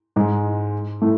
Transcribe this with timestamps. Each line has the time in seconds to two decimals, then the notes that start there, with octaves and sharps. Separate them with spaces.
0.16 G#2 G#3
1.01 A2 A3